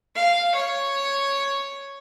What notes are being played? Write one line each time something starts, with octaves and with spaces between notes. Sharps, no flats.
F5
C#5